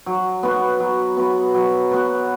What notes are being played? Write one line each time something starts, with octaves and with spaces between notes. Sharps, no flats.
F#3
B3 F#4 B4
F#3
B3 F#4 B4
F#3
B3 F#4 B4